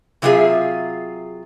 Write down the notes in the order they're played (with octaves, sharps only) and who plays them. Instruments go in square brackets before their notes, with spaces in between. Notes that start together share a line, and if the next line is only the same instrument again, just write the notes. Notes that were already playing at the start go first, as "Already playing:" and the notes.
[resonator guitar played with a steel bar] C3 F#3 E4 F4 G#4 E5